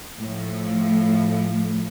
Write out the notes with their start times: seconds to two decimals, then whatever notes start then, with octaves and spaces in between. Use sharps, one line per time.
0.19 A2 F3 A3